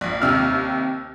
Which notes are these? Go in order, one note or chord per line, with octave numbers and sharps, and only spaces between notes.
A#1
D#2 C3 E6 F6